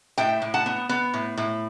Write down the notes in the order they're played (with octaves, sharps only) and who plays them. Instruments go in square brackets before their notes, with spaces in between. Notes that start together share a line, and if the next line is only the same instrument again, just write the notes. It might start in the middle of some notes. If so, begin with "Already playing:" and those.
[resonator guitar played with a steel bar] A2 E5 G5
A2
F#5 A5
B3
B3
A2
A2